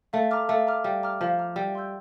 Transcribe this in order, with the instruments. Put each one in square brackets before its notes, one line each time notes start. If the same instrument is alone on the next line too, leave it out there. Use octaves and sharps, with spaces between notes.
[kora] A3 [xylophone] F5
[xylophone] A#5 D6 F6
[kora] A3 [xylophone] F5
[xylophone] A#5 D6 F6
[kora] G3 [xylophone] F5
[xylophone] A#5 D6 F6
[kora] F3 [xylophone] F5
[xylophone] A#5 D6 F6
[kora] G3 [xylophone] E5
[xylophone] G5 C6 E6 G6